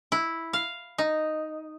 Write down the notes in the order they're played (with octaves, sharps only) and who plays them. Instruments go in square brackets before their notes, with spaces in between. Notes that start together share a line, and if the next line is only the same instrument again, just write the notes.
[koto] E4
F5
D#4